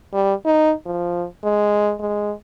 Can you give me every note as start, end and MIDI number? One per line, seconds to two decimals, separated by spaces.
0.14 0.34 55
0.45 0.73 63
0.86 1.25 53
1.44 1.93 56
2.00 2.33 56